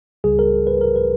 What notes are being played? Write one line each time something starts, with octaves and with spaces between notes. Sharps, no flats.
C#2 C#3 G3 G#4
A#4
B4
A#4
B4